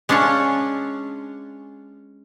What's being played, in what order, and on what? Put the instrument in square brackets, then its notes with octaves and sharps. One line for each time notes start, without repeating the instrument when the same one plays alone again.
[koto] G#3 C#4 D4 F4 C#5